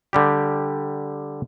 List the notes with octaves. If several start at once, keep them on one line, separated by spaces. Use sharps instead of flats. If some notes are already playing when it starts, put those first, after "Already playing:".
D3 G3 G4